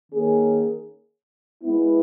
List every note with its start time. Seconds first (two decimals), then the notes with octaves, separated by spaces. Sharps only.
0.12 D#3 A#3 C#4 G#4
1.63 G#3 B3 E4